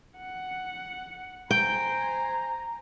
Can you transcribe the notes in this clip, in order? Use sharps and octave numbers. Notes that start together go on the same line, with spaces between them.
F#5
C5 G5 G#5 A#5